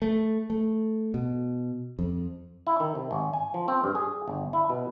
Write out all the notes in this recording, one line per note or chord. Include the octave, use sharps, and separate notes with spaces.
A3
A3
B2
F2
E4
D#3
C3
G#1
G#5
F3
C4
G2
G#4
G1
E4
B2